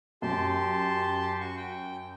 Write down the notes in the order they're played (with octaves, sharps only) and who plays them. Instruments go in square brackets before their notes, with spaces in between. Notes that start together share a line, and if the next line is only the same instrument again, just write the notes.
[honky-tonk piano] F#2 [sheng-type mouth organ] G4 A5 C6
[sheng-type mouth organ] F#4 C#6
G5